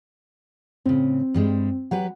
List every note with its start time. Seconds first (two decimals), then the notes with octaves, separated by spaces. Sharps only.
0.86 A2 C#3 C4
1.34 G2 G3 G#3
1.91 F#3 G4 B4 F#5